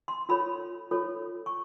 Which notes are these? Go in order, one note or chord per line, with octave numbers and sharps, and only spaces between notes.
C6
F4 A4 C#5 B5
F4 A4 C#5
C#6